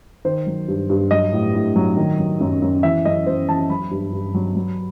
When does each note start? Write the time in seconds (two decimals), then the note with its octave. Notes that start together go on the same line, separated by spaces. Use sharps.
0.25 D#3 C5
0.46 F#3
0.68 G2
0.90 G2
1.11 F#3 D#5
1.32 A2
1.55 A2
1.76 F#3
1.97 D#3
2.18 F#3
2.41 F#2
2.62 F#2
2.83 E3 E5
3.05 F#2 D#5
3.26 F#2 C5
3.48 E3 A5
3.69 F#3 B5
3.91 G2
4.13 G2
4.34 F#3
4.56 F#3